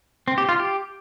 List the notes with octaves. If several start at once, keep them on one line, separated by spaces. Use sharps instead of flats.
C4
G4
F4
G4